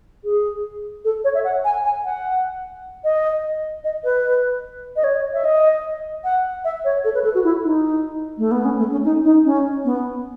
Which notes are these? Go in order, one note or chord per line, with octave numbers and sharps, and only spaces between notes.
G#4
A4
C#5
E5
F#5
G#5
G#5
F#5
D#5
D#5
B4
D#5
C#5
E5
D#5
F#5
E5
C#5
A4
B4
A4
F#4
E4
D#4
A3
B3
C#4
A3
C#4
D#4
D#4
C#4
B3